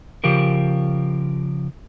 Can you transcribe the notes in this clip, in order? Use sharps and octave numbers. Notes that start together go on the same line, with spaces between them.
C#3 F3 G4 A#4